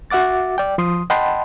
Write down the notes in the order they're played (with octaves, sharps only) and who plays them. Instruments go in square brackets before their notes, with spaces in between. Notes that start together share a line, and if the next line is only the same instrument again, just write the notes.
[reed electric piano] F#4 E5 F#5 D6 A6
D5 G5
F3 C6 D#6
D#5 F#5 G5 A5 B5 C6